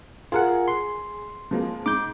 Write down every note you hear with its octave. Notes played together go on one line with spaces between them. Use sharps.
F4 G#4 A#4 F#5
C6
F3 G#3 A#3
G#2 D6 G6